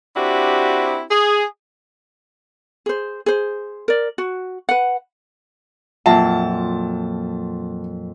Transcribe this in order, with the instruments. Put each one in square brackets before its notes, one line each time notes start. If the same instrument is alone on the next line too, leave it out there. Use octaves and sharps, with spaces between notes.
[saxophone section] C4 D4 E4 F#4 G4
G#4
[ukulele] G#4 C5
G#4 C5
A#4 D5
F#4
B4 F#5
[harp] F2 A#2 F#3 [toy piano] F4 E5 F#5 [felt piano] A5